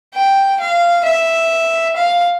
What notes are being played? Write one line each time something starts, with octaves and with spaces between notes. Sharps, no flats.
G5
F5
E5
F5